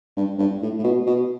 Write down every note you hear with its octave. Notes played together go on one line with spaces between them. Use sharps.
G2
G2
A2
A2
B2
B2